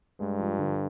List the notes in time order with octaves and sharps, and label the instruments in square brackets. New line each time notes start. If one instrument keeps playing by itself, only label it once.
[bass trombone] G2 [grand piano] G#3
[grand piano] F3
D3